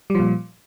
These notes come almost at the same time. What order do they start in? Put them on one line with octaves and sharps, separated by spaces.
G3 F3 A#2